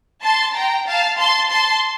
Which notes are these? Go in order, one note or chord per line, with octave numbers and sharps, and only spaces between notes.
A5 C6
G5 A#5
F5 A5
A5 C6
A5 C6